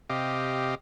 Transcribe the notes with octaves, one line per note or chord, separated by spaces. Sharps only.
C3 G4 D#5 F5